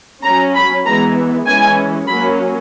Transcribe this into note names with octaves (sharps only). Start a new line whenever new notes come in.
F#3 C#4 A#5
B5
E3 G#3 B3 A#5
E3 G#3 C#4 G#5
F#3 A#3 C#4 B5